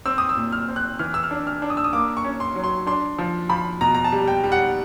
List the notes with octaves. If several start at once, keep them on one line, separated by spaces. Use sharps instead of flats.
C4 E6
D#6
E6
A#2
F6
C4
F#6
E3 F6
E6
F6
D4
F6
D4
D#6
E6
D#6
A#3 D6
C#6
C#4
C6
F#3
C6
D4 C6
F3
F3 B5
B2 A#5
A#5
A5
G3
G5
G3
F#5